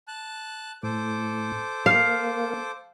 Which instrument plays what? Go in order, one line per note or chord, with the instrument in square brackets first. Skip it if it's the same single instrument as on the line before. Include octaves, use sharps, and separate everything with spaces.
[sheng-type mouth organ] A5 F#6
[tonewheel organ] A2 [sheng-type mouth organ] A4 C5 D6
[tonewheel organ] A#3 [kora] F5